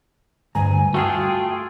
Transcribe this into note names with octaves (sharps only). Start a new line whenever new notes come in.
D2 G2 G#5 A#5
A3 F4 F#4 G#4 G5